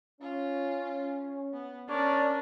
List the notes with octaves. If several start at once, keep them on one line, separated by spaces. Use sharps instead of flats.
C#4 F4
B3
C#4 D4 A#4 C#5 D5